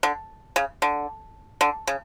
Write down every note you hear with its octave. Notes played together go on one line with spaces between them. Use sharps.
D3
C#3
D3
D3
C#3